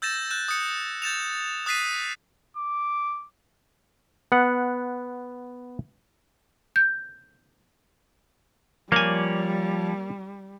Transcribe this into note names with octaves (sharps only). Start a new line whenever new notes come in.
E6 G6 A6 A#6 E7
F#6 G6 E7
D#6 C#7
G6 A6 E7 F7
D#6 F#6 A6 B6 C7 D#7
D6
B3 F#5
G6
F3 G3 A#3 C#5 D5 G#5